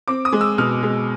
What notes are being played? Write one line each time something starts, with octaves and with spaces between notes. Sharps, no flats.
C4 D6
D#6
G#3
E6
B2 F6
G#3